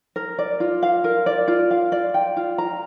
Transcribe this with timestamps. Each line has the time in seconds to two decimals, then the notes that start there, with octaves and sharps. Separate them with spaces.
0.16 A#4
0.38 D5
0.60 F4
0.83 F5
1.04 A#4
1.26 D5
1.48 F4
1.71 F5
1.92 D5
2.14 G5
2.37 F4
2.58 A#5